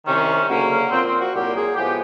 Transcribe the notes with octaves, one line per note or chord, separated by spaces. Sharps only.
C2 C3 D#3 C#4
D2 C#3 F#3 A#3 C#4
C#4
A#2 F3 A#3 C4
C4
F#4
C2 A#2 F#3 A#3 G4
G#4
A2 F3 G#3 B3 G4